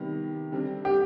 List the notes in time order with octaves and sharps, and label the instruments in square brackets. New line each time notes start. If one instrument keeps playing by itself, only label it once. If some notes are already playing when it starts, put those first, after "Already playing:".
Already playing: [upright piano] C3 D#3 G3 B3
D3 G3 C4
[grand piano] G4